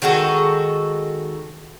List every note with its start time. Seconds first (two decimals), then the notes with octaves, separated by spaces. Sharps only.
0.02 D#3 G#3 F#4 A4